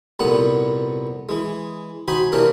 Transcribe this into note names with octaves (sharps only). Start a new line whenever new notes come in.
C2 F2 A#2 B3 F#5
E3 G#3
D#4 F#4 C5 G#5 B5
C3 E3 A#3 C#4 D4 A#4